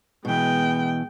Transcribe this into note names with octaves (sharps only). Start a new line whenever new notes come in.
B2 E3 G#3 G5